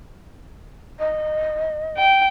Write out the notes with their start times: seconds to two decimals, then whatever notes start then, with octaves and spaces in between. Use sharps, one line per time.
0.99 D#5
1.97 G5